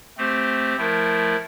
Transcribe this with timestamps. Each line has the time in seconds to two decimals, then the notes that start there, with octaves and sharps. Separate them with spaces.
0.18 A3 C4 G4 C5
0.77 F3 A3 E4 A#4